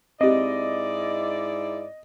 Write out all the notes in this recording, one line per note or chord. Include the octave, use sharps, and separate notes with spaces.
G#2 C4 E4 G4 D5 D#5